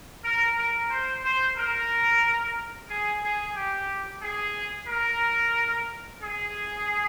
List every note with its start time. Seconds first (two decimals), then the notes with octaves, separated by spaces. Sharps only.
0.24 A#4
0.57 A#4
0.90 C5
1.23 C5
1.56 A#4
2.89 G#4
3.22 G#4
3.55 G4
4.22 G#4
4.88 A#4
6.21 G#4